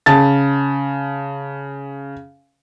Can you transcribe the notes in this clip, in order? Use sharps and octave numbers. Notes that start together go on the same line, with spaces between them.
C#3 A5 A6